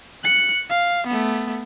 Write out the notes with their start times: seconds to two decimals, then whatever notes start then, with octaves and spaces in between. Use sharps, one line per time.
0.24 F#6 C#7
0.70 F5
1.07 A3 B3